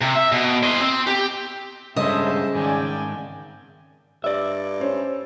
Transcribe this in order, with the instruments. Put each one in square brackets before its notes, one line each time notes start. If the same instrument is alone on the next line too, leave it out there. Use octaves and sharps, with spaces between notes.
[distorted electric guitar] C3
E5
B2
C5 D#5
C4
G4
[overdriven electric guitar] G2 G#3 [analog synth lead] C#3 [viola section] A4 C5 E5 [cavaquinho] D#5
[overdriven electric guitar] G#2 D#3 [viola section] D5 G5 G#5
[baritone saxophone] G2 [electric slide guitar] D5 E5
[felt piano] C#4 C5 C#5